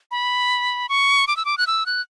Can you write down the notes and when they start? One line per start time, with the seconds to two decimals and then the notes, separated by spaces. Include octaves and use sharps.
0.11 B5
0.89 C#6
1.27 D6
1.37 E6
1.45 D6
1.58 F#6
1.67 E6
1.86 F#6